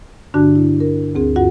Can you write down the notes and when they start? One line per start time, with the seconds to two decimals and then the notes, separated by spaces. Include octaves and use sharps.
0.34 G2 D3 D4 F#4 A5 F#6
0.55 E4
0.80 A#4
1.15 D2 C4 G#4
1.36 G2 F4 F#4 F#5